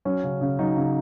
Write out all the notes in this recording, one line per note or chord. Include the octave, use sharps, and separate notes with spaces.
F#3 C#4
C#3
C#3
F#3 D#4
C#3